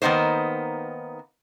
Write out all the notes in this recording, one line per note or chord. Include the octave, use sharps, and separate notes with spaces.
D#3 A#3 B3 D#4 C5